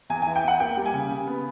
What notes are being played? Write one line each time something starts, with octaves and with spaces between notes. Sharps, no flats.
E2 G#5
G#5
E3
G5
E2 F#5
A#3 G5
G3
G#5
C#3
C#3
B3